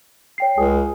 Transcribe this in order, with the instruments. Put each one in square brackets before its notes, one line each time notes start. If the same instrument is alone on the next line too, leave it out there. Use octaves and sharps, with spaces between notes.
[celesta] C#5 G5 C7
[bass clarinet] C#2 [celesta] G#4 G#5 D#6